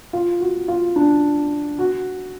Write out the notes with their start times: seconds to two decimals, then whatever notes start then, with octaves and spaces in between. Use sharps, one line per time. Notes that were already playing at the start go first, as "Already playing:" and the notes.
0.13 F4
0.40 F#4
0.68 F4
0.96 D4
1.79 F#4